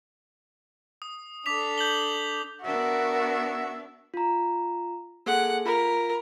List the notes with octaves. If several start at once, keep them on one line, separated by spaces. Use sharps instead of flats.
D#6
D4 A4 D6 B6 F7
G6 F#7 G7
B3 D4 F#4 A#4 E5
F4 A#5
A#3 G#4 A4 F#5
F4 A#4 B5